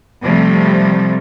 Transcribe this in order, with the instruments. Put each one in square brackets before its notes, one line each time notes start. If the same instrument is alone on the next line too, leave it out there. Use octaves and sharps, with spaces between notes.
[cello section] C3 F3 G3 A3